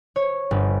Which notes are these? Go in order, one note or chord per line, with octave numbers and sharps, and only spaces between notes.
C#5
G1